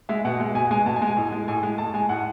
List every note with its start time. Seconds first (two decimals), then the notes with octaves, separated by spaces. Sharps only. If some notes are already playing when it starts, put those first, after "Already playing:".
0.09 G#3 E5
0.25 B2 F#5
0.40 G#3
0.55 B2 G#5
0.71 G#3 G#5
0.86 B2 A5
0.96 G#5
1.02 G#3
1.07 G#5
1.17 A2
1.32 G#3
1.48 A2 G#5
1.63 G#3
1.78 A2 A5
1.94 G#3 G#5
2.09 A2 F#5